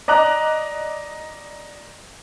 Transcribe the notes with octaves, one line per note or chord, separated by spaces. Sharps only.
D5 D#5 A#5 F#6